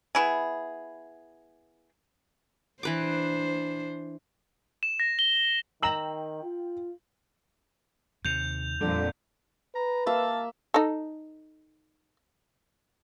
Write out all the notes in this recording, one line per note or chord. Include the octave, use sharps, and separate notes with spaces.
B3 E4 G#4
E3 D4 B4 C5 D6
E7
A#6
G7
D#3 G5 A#5 E6 F#7
F4
D#2 C3 G6 F7
F2 A#2 D3 G3
B4 A#5
A#3 E5 F5 A5
D#4 A4